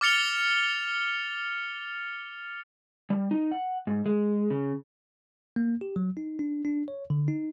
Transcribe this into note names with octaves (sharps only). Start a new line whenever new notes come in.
D6 F6 A6 C#7 F7 G7
G3
D#4
F#5
G#2
G#3
C#3
A#3
G4
F#3
D#4
D4
D4
C#5
D3
D#4